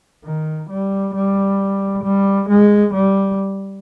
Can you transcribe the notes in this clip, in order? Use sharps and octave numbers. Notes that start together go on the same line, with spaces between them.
D#3
G3
G3
G3
G#3
G3